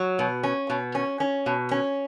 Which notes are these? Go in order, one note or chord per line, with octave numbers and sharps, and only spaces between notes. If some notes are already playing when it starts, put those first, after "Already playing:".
Already playing: F#3
B2
C#4
B2
C#4
C#4
B2
C#4